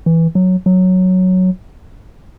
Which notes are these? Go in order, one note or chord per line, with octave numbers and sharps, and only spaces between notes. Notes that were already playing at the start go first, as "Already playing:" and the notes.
E3
F#3
F#3